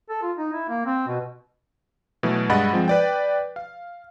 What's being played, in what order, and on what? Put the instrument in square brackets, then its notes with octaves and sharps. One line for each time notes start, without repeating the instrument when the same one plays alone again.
[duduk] A4
F4
D#4
E4
A#3
C4
B2
[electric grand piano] B2 E3 F#3 A3
G2 G#3 D#5 F#5 B5 A6
F3 G#3 C4
B4 D5 G5
F5